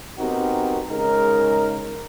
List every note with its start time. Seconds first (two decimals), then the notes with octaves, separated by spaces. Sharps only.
0.19 B3 C4 D#4 F#4 G4 A#4
0.90 C#3 G#3 D#4 A#4